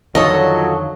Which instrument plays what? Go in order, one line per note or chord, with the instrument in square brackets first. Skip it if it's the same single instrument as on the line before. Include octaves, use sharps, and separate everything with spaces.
[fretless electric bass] F2 D3 D#3 [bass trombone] F#3 [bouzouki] F4 A4 C#5 [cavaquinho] D#5